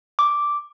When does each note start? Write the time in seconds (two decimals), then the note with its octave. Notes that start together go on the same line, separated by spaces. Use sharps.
0.19 D6